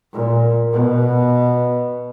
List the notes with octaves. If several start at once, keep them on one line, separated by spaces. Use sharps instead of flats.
A#2
B2